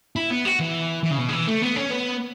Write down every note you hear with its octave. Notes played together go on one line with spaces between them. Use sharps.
E4
B3
F#4
E3
E3
C#3
B2
C#3
E3
A3
B3
C#4
B3